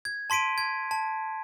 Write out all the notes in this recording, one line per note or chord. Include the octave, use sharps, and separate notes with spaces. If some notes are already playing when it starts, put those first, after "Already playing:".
G#6
A5 C6 B6 D7 D#7
G#6
A5